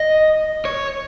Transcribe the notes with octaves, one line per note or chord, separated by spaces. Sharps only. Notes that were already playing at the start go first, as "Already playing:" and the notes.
Already playing: D#5
C#5